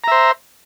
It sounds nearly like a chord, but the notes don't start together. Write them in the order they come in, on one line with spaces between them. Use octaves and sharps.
A#5 E5 C5